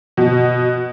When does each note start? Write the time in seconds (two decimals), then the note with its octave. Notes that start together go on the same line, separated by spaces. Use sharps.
0.17 B2